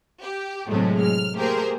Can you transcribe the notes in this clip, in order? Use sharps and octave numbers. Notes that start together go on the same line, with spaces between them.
G4
A2 C3 F#3 G#3 A3
F6
A3 A#3 G4 G#4 A#4 C5